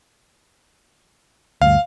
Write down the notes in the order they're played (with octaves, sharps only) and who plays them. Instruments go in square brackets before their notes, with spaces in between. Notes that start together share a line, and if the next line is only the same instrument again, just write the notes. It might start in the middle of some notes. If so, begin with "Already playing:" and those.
[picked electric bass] D2 G2 [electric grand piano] F5